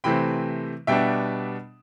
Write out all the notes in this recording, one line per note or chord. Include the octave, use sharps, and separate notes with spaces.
C3 E3 A3 C4 G5 B5
B2 G3 B3 D4 E5 G5